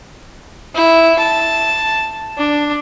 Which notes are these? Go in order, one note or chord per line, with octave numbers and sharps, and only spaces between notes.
E4
A5
D4